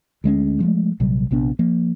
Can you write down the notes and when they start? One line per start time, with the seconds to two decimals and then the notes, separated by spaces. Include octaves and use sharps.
0.24 D2 G#3 B3 C#4
0.60 F3 G#3 A3
1.00 A#1 C3 F#3 G3
1.31 A#1 C3 B3 D4
1.59 F3 A#3